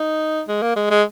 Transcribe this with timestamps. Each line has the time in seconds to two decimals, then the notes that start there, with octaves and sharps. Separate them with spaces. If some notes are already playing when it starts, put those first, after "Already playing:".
Already playing: D#4
0.48 G#3
0.62 A#3
0.76 G#3
0.90 G#3